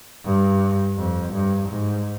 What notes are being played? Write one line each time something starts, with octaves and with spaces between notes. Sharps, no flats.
G2
F2
G2
G#2